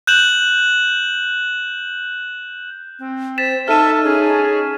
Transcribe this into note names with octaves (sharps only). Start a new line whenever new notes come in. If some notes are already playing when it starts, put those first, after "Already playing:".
F#6 G6 E7 F#7
C4
C5 A6 B6 E7
D#4 A4 E5 F6 D#7
C#4 G#4